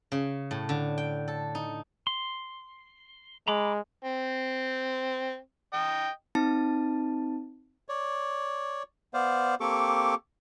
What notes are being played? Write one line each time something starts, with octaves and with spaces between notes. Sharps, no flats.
C#3
A2
D3
G5
A4
D#4
C6
G#3 A#5 B5 D6
C4
D#5 G5
C4 D#4 A5
C#5 D5
B3 C5 D5 F5
A#3 C4 G4 A4 C#6 D6